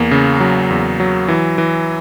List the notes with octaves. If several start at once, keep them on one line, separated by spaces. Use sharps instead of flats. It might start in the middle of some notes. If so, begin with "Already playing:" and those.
Already playing: E2 A#3
C#3
F#3
E2
F#3
E3
E3